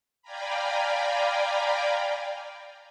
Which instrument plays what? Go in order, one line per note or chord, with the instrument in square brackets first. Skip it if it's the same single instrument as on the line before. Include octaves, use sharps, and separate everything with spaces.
[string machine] D5 F5 G5 G#5 A#5 B5